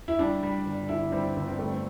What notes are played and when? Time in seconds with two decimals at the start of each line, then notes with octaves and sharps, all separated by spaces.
0.08 E4
0.19 G3 D4
0.43 G3
0.66 G1
0.89 D3 E4
1.12 G3 C4
1.36 G1 C4
1.47 C4
1.58 G3 A3
1.71 C4